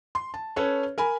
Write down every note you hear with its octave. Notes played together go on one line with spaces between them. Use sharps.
C6
A5
C#4 A4 B4 C#5
A#4 G#5 B5